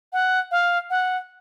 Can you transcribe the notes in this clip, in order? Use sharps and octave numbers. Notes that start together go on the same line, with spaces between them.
F#5
F5
F#5